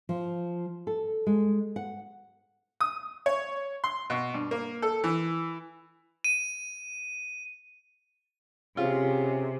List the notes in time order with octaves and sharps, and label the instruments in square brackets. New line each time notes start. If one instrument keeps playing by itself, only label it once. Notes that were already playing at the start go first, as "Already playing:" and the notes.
[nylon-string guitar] F3
A4
G#3
F#5
[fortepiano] D#6
C#5
C6
B2
G2
A#3
A4
E3
[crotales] D#7
[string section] C3 [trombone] C#4 [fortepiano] F4 [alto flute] G#4